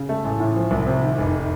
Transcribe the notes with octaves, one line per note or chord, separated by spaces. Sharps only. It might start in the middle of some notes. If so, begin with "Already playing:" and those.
Already playing: C#3
A3
A1
A2
F3
C2
C3
D#3
F1